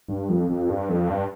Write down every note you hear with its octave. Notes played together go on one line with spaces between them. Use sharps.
G2
F2
F2
G2
F2
G2